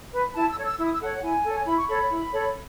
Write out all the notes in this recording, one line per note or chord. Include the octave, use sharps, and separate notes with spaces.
B4
E4 A5
E6
A4 C#5
E6
E4 E6
D#6
E6
A4 C#5 F#5
E4 G#5
A4 C#5
E4 B5
C#6
A4 C#5 B5
E4
A4 C#5